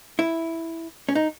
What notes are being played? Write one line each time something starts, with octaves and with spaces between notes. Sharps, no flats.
E4
C#4
D#4